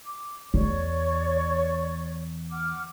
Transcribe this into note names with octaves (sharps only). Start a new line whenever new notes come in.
D6
E2 C#5 D5 C#6
F#5 D6 F6